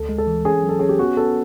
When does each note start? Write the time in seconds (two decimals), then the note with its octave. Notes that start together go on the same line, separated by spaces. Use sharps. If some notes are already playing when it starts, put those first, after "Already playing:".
Already playing: D2 A4
0.09 G#3
0.18 A4
0.27 E3
0.45 C#4 G#4
0.63 F#3
0.69 A4
0.79 C#4 G#4
0.89 G4
0.99 B3 F#4
1.17 B3 A4